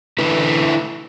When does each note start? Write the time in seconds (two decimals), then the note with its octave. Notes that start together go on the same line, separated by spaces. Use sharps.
0.18 D3 A3 E4 B4